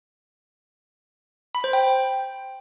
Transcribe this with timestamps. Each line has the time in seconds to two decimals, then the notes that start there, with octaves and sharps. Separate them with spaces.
1.55 B5
1.64 C5
1.73 G5